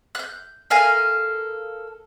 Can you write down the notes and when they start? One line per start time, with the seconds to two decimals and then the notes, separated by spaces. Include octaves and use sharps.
0.15 F#6 G6
0.70 A4 A#4 F5 G#5